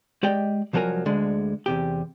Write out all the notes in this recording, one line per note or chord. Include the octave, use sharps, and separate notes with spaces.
G#3 G4 D5 D#5 G5
C2 F3 F#3 A4 A#4 G#5
D2 D3 G#3
E2 C3 G4